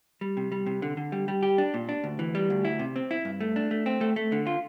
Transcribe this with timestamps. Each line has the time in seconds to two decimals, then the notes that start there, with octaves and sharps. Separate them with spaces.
0.21 G3
0.37 C3
0.52 G3
0.66 C3
0.82 D3
0.97 D3
1.12 G3
1.28 G3
1.43 G4
1.58 D4
1.74 A#2
1.89 D4
2.04 D2
2.19 E3
2.35 G3
2.50 D2
2.65 E4
2.79 C3
2.96 C4
3.11 E4
3.25 G2
3.40 A3
3.56 D4
3.71 A3
3.86 C4
4.01 A3
4.16 A3
4.32 D3
4.47 F4